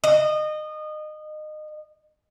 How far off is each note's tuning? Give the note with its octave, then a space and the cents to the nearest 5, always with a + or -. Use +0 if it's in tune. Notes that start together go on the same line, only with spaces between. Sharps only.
D#5 -25